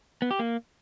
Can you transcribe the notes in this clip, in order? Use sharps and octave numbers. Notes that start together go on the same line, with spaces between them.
B3
G4
A#3